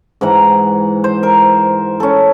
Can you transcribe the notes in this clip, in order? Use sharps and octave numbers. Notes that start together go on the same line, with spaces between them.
G#2 E3 F#5 A#5
C5
A#4
C#4 A4